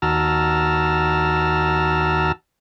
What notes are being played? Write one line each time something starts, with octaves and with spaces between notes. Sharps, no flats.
D#2 F#4 A5 A#5 E6 F6